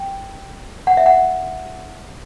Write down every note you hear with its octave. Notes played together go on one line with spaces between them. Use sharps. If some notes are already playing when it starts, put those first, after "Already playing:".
Already playing: G5
F#5
E5
F#5